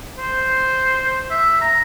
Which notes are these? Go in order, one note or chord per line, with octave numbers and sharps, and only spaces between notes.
C5
E5
A#5